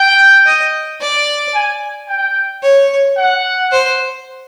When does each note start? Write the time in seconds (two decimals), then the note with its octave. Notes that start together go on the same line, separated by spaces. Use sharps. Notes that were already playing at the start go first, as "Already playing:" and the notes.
Already playing: G5
0.46 D#5
1.01 D5
1.54 G#5
2.09 G5
2.63 C#5
3.17 F#5
3.71 C5